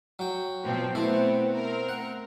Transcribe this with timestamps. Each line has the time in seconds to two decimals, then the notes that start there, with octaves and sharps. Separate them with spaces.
0.19 F#3 G5
0.64 B2 F3 C4
0.95 A3 B3 C4 E4
1.55 C4 A#4
1.89 F#5